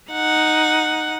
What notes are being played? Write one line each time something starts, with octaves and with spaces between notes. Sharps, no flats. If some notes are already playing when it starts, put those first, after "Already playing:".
D#4 F#5